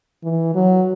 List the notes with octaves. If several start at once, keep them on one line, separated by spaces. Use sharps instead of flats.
E3
F#3